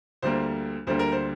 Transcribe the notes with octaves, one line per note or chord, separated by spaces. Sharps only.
D2 D3 G3 A#3 C5
D2 D3 G3 A#3 C5
A#4
C5